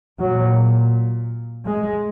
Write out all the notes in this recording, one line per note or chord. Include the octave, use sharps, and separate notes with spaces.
A#2 F#3
G#3